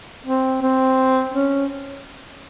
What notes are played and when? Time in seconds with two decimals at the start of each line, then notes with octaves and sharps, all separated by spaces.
0.26 C4
0.62 C4
1.34 C#4